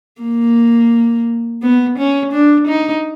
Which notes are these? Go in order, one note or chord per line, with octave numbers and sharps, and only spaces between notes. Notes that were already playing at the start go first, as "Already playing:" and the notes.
A#3
B3
C#4
D4
D#4